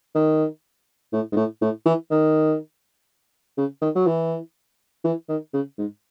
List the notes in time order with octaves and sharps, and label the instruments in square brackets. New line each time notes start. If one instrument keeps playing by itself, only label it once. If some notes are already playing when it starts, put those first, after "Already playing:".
[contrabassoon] D#3
A2
G#2
A2
A2
E3
D#3
C#3
D#3
F#3
E3
E3
D#3
C#3
G#2